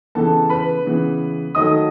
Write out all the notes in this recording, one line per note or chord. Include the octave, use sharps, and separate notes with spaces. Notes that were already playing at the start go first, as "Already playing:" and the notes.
C#3 E3 B3 A4 A5
B4 B5
C#3 E3 B3
D#3 F#3 A3 D#5 D#6